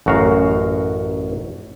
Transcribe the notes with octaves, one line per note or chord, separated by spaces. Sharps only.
A1 F#2 F#4 A#4 F5